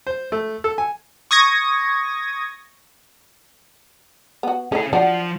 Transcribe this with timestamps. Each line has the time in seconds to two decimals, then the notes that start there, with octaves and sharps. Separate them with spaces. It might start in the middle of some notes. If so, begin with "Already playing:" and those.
0.07 C5
0.32 A3
0.64 A4
0.78 G#5
1.31 C#6 D#6 G#6 A#6
4.43 B3 F#4
4.72 A3 C#4 E4 G#4
4.93 F3 D4 F#4